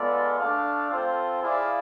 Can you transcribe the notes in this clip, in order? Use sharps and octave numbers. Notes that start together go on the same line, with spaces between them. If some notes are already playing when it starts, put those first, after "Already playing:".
Already playing: G#3 B3 F4 A4 D5
A3 D4 A4 D5 F5
C4 F4 A4 C5
E4 G#4 D5 F5